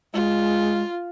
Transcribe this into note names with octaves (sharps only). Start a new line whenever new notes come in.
G#3 F4